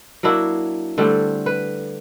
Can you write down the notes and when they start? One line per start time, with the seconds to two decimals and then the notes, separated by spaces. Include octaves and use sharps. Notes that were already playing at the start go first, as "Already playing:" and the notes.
0.23 F#3 A#3 D4 E4
0.98 D3 G3 A3 C4
1.46 B4